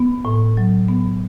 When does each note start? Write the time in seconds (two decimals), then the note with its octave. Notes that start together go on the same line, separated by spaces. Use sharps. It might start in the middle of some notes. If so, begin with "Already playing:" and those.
Already playing: B3
0.25 A2
0.57 F#3
0.88 B3